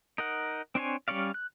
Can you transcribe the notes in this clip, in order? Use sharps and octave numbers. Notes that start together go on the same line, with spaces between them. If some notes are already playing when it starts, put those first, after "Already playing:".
D#4 A#4 F#5
C4 D4 C5 C#5 G#5
G3 C#4 C#5 D5 F5
F#6